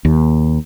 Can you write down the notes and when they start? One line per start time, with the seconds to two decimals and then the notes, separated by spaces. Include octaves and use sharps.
0.05 D#2